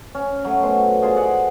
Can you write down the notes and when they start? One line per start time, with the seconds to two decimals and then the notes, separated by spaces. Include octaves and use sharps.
0.15 C#4
0.45 F#3 A3
0.63 B2 C5
1.02 D#4 F4 G#4 C5
1.16 G#4 D5 F#5